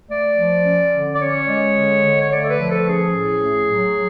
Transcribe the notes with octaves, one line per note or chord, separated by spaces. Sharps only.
A3 D5
F3
C#4
D3
D5
C#4 C#5
G#3
D3
D3
C#5
A3 D5
A4
B4
F3
A4
C#4 G#4
A2
A3
F#3